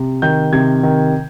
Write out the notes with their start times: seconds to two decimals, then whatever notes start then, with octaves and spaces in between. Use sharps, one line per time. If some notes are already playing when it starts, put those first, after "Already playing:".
Already playing: C3
0.22 D#3 G6
0.53 C3 G#6
0.83 D#3